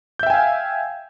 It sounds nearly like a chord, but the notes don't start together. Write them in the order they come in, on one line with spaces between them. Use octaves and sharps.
G6 E5 G5 G#5 F5